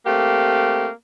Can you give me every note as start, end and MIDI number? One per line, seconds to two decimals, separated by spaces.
0.06 0.87 57
0.06 0.87 58
0.06 0.87 60
0.06 0.87 67